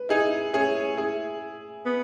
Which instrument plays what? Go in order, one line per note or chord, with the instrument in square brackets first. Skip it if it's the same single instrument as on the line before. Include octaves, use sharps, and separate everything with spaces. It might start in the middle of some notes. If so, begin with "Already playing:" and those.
Already playing: [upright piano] B4
[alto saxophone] D#4 [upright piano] E4 G#4
[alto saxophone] C#4 [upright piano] E4 G#4
[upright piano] E4 G#4
[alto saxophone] B3